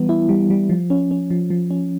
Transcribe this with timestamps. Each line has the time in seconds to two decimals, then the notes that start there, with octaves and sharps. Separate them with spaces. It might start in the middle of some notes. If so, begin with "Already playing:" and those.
Already playing: E3 G3 B3
0.09 E4
0.29 G3
0.50 G3
0.70 F3
0.90 C#4
1.11 C#4
1.31 F3
1.50 F3
1.71 C#4